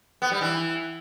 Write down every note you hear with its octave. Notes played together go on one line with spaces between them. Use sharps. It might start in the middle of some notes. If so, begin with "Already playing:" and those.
B3
G3
E3